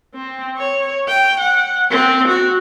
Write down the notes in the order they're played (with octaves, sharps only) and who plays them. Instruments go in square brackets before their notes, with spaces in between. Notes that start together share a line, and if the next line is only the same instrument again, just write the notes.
[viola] C4
C#5
G5
F#5
C4
F#4